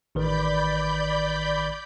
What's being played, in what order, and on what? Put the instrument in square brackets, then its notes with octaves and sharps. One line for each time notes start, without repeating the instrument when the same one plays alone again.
[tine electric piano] A1 D#3 B4 [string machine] D5 B5 G6